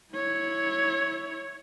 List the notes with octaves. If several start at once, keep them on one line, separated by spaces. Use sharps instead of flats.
E4 C#5